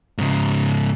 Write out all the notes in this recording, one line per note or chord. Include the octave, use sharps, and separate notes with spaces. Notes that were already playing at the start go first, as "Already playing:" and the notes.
G#2 C#3